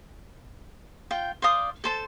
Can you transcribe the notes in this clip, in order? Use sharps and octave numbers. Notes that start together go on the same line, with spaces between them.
F4 G5
C5 D5 F5 D#6
A4 C5 A5